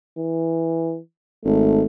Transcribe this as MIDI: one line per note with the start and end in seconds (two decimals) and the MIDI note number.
0.18 0.99 52
1.45 1.84 32
1.45 1.85 57